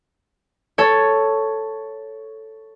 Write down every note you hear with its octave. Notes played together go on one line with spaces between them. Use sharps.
A4 C#5